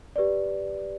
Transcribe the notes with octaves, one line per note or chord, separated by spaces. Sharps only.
G4 B4 D5